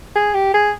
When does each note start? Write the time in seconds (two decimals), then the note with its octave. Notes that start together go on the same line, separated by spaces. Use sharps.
0.15 G#4
0.34 G4
0.54 G#4